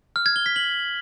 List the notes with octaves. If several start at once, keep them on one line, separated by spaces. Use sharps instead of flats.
F6
G#6
G7
B6
F#7